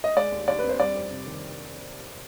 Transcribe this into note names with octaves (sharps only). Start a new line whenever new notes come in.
D#5
G#3 D5
D#2
D#2 D5
B4
C4
C5
G3 D5
F2
C3
D#3